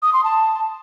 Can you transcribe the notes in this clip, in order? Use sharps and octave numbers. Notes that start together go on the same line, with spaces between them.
D#6
C6
A5